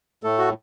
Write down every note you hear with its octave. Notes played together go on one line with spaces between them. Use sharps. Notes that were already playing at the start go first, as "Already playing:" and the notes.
A2 A3 A4
F#4